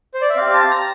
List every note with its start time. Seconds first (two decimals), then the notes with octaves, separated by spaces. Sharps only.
0.14 C5
0.21 D5
0.30 E5
0.36 C4 G4 F5
0.54 A5
0.71 A#5